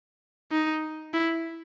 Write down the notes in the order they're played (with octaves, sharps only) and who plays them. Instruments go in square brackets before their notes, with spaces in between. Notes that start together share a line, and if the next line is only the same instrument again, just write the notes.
[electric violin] D#4
E4